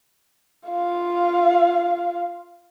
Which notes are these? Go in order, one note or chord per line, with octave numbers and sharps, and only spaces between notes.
F4 F5